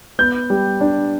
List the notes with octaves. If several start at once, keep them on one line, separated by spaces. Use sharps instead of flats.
B3 G6
G3
D4